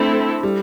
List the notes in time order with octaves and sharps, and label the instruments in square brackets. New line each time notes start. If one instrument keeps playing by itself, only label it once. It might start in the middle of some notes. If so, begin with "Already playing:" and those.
Already playing: [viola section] A3 C4 E4 A4 [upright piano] D4
[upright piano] G3